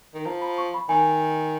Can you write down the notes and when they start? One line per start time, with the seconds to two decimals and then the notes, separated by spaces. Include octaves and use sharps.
0.14 D#3
0.26 F3 A#5
0.42 B5
0.58 C#6
0.74 B5
0.89 D#3 G#5